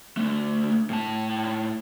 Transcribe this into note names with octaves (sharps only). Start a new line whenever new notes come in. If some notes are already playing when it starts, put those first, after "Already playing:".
D2 A3
A2 A5